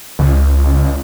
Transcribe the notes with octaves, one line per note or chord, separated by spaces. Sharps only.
C#2